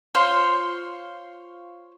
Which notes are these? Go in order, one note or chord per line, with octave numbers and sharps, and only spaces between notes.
F4 C5 C#5 C6